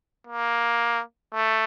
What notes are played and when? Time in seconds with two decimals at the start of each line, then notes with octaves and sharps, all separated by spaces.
0.27 A#3
1.33 A3